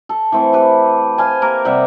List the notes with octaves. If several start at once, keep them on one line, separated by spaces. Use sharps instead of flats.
A4
E3 A3 C4
G4 B4
C5 F5 G#5 A5
A#3 G4 A#4
C3 G3 E5 F#5